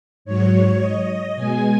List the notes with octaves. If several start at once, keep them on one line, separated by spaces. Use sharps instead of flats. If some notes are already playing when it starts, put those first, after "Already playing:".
G#2 F#3 C#5
D#5
B2 G#3 G#5